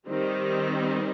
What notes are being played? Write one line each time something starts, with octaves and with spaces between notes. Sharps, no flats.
D#3 G3 C4 D#4